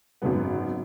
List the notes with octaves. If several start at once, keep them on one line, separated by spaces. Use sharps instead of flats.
G#1 F#2 C#3 F#3 B3